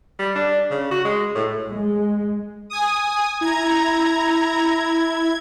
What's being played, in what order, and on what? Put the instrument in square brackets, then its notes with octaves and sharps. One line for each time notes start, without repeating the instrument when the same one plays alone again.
[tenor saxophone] G3
D4
C#3
F#4
G#3
A2
[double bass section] G#3
[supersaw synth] G#5 D#6
[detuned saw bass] E4 [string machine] A#5 [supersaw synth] G#6